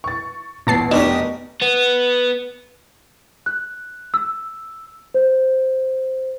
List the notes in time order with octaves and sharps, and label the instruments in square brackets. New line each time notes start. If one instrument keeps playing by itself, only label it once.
[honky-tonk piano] C#6 A6
[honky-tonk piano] A1 E2 [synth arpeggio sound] A#2 A5 C7
[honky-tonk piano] F1 D#4 E7 [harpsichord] B2 G4 A#4 [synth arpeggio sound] D4
[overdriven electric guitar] B3
[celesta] F#6
E6
C5